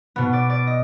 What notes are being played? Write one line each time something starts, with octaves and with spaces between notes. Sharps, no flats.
B2 B3
D5
D5
D#5